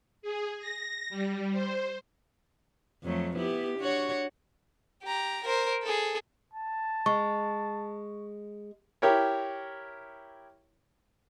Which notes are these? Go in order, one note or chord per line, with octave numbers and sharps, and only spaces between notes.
G#4
A#6
G3
C5
F2 F#3 A3
B3 E4 G4
D4 F#4 C#5
G4 A#5
A#4 C5
G#4 A4
A5
G#3 C#6
E4 G4 A#4 C#5